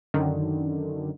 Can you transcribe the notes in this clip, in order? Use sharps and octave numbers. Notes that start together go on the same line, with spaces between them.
F#2 D3 D#3